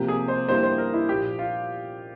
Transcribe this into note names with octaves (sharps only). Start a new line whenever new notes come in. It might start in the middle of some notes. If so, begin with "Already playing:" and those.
Already playing: C3 F3 A#3 G4
G#4
C5
G2 F3 A#3 E4 G4 C5
C5
A#4
E4
A#2 F3 A#3 G4
F4